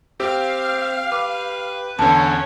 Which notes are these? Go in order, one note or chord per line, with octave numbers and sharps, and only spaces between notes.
C4 G4 F5
B4 D6
E2 D3 C#4 C#5 A5